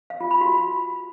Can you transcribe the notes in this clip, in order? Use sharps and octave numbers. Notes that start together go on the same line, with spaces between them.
F5
F4
B5
F#4